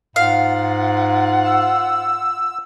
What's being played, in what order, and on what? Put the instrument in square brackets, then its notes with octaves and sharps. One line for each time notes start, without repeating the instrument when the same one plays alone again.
[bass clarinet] G#2 [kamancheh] F4 F#5 [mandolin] F5
[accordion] E6